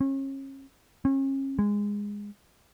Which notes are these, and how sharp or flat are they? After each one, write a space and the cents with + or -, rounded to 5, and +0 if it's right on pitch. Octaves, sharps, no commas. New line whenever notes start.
C#4 -35
C#4 -35
G#3 -15